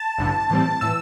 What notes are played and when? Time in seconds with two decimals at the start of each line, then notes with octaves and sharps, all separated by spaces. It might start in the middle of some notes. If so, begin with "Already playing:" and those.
Already playing: A5
0.18 A1 G2 D3
0.50 A2 E3 G3 C4
0.81 A2 E3 E6